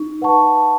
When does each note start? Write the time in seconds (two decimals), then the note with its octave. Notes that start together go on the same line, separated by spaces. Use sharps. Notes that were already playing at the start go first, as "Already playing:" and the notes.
Already playing: D#4
0.21 B4 F#5 A5 C#6